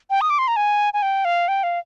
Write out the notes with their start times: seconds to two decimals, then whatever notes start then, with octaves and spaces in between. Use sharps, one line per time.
0.10 G5
0.21 D#6
0.30 D6
0.39 C6
0.48 A#5
0.56 G#5
0.94 G#5
1.02 G5
1.25 F5
1.48 G5
1.63 F5